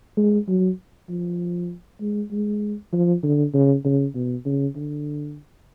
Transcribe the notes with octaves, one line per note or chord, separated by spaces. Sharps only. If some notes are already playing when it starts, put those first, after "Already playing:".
G#3
F#3
F3
G#3
G#3
F3
D3
C#3
C#3
B2
C#3
D3